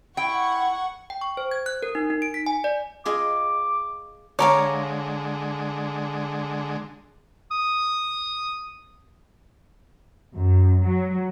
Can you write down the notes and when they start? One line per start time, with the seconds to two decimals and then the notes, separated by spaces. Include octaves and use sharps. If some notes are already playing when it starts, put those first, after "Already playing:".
0.17 E4 F#5 G5 C#6
1.10 G5
1.21 C#6
1.37 C5
1.51 G#6
1.66 F#6
1.83 A#4
1.95 D#4
2.10 D#4
2.22 D7
2.34 B6
2.46 G#5
2.64 D5
3.05 F4 G#4 D#5 D6
4.39 D3 G#3 C#5 F5 A#5 D6
7.51 D#6
10.34 F#2
10.82 F#3